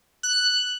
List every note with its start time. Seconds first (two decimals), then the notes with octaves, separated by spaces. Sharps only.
0.23 F#6